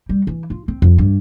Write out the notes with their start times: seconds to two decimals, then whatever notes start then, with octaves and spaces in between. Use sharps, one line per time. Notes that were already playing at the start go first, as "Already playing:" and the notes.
0.09 G3
0.27 E3
0.50 F4
0.68 C4
0.82 F2
0.98 G2